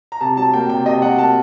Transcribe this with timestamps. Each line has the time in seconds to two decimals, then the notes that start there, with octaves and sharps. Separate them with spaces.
0.12 A#5
0.21 C3 A5
0.37 F#3 A5
0.53 A#3 G5
0.69 C3 G5
0.86 C3 D#5
1.02 F#3 F#5
1.18 A#3 A5